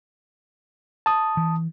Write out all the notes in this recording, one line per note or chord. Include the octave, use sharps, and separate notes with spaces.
A5 D#6
E3